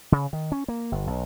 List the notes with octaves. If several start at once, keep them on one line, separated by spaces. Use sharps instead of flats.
C#3
D#3
C#4
A#3
G1
B1